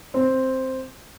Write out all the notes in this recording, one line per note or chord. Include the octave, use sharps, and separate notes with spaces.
C4